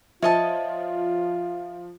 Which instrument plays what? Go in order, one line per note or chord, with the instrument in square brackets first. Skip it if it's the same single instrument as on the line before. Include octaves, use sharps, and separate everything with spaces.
[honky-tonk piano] F3 [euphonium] F4 [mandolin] C#5 D#5 A5 [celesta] E5